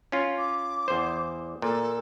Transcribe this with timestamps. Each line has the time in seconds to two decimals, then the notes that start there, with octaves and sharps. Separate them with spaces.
0.12 C#4 F4
0.38 D6
0.88 E2 C5
1.62 A#2 A4